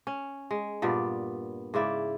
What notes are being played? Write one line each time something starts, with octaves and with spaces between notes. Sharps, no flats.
C#4
G#3
G2 A#2 B3 D5
G#2 C#3 E4 D5